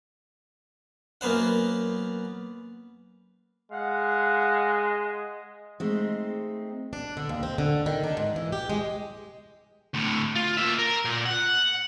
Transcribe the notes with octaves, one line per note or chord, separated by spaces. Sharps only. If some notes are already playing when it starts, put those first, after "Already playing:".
F#2 A#3 B3 C5 F#5
G#3 F5 F#5
G#3 A3 C4 D#4
D4
D3
D#2
C4
D3
D#3
D4
G#2
E3
G4
G#3
D2 A2
F4
A#3 E5
A#4
A#2
F#5